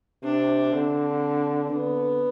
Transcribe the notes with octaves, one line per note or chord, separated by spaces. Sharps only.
C3 D4
D3 C4
D3 B3